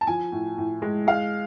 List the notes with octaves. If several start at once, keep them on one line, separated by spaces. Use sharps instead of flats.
A5
F3 G#5
A2
A2
G#3
G#3 F5